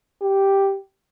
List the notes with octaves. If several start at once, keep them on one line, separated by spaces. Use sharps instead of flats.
G4